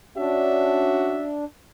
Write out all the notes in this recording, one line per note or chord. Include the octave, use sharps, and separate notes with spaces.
C#4 D4 F#4 E5